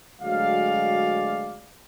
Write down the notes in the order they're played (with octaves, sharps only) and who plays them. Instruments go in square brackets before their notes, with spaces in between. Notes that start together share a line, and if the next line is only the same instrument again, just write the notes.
[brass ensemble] D2 F#3 G#3 D5 F5